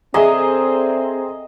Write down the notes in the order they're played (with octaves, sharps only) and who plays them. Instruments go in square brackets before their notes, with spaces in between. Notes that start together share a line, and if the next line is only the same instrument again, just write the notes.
[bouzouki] D3 [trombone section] C4 [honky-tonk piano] G#4 A#5 [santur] D#5 E5 D#6